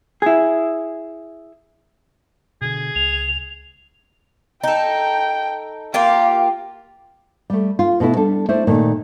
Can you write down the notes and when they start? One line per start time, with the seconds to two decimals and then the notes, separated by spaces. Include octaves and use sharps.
0.22 E4 G#4
2.61 B2 D3 G#4
2.95 C#2 F7
4.63 D#4 A4 G5
5.94 A#3 F4 G4 F5
7.50 G3 A3
7.79 F4
8.00 B2 A3 B3 E4
8.17 G3 D4 A4
8.49 A3 D4 E4 C5 E5
8.67 A#2 D#3 A3